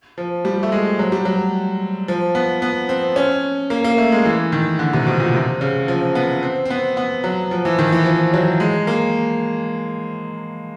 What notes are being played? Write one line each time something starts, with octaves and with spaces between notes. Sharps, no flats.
F3
G3
A3
G#3
F#3
G3
F#3
F3
B3
B3
C4
C#4
A#3
A#3
A3
G#3
E3
D#3
D3
C3
B2
A#2
C3
C#3
F3
B3
C4
C4
B3
B3
F#3
F3
E3
D#3
E3
F3
F#3
G#3
A#3